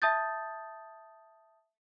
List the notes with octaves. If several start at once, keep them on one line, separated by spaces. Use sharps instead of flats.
E5 A5 D#6 G6 A6